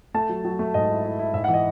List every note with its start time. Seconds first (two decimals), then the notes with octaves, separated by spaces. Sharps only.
0.14 A3 A5
0.29 F#3
0.45 F#3
0.59 A3
0.74 G#2 D#5
0.89 E4
1.04 E4
1.19 E4
1.34 G#2 E5
1.44 F#5
1.48 E3
1.54 D#5